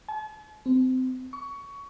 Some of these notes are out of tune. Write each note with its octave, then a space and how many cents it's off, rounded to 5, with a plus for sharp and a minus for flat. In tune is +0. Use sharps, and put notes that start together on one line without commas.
A5 -45
C4 -25
C#6 +20